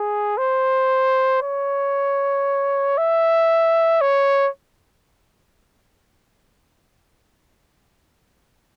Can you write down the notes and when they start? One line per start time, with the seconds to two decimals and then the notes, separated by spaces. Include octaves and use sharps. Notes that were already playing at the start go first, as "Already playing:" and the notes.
Already playing: G#4
0.38 C5
1.42 C#5
2.98 E5
4.01 C#5